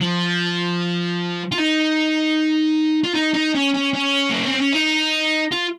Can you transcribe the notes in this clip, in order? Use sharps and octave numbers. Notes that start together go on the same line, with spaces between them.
F3
F4
D#4
F4
D#4
D#4
C#4
C#4
C#4
A#3
C4
C#4
D#4
F4